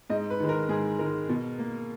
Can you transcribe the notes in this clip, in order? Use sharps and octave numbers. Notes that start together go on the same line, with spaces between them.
G#2 D#5
B4
D#3 G#3
A#4
G#2 G#4
D#3 G#3 A#4
B2
A#3